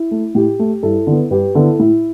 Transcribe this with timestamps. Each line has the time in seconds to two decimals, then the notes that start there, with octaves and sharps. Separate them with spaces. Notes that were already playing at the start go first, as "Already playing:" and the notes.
Already playing: E4
0.11 A3
0.35 A2 G4
0.59 A3
0.83 G2 E4 A4
1.07 D3 B3
1.31 G2 G4 B4
1.55 D3 B3 E4 A4
1.80 A2 E4